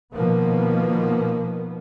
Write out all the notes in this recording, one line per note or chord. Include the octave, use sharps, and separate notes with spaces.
B2 D#3 F3 A#3 B3